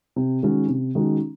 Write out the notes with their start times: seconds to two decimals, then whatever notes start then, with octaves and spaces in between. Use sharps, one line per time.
0.16 C3
0.43 D#3 G#3 C#4 F#4
0.68 C3
0.95 D#3 G#3 C#4 F#4